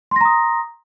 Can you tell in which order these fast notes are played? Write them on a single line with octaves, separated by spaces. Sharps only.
C6 A#6 A#5 D#6